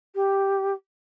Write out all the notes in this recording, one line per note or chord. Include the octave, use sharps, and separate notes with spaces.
G4